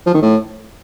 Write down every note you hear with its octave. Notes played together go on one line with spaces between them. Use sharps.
F3
D#3
A2